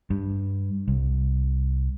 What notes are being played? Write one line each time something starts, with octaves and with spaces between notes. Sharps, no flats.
G2
C2